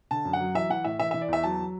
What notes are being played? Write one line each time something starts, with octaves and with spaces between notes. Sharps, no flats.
D3 A5
F#2
F#5
F#3
E3 E5
E3 F#5
A2 E5
E3 E5
E3 E5
D5
E2 E5
F#3 A5
F#3